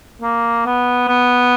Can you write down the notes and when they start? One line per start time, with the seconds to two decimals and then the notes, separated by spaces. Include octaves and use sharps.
0.22 A#3
0.66 B3
1.08 B3